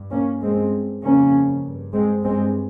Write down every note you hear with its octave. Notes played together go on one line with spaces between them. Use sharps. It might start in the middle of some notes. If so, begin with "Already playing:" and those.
Already playing: G2
A#3 C#4
G2 G#3 C4
F2 C#3 A#3 C#4
G2
G#3 C4
G2 G#3 C4